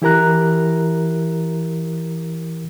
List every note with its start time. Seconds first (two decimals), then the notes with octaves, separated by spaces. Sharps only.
0.02 E3 E4 G4 A#4 A#5 F#6